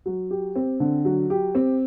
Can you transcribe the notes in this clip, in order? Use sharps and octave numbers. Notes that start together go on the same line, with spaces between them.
F#3
G4
C4
D3
F#3
G4
C4